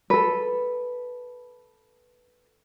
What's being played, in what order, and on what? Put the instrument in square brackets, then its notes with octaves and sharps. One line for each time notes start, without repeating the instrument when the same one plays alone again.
[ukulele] A4 B4